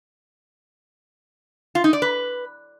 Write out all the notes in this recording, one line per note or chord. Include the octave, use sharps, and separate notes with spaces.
F4
D#4
D5
B4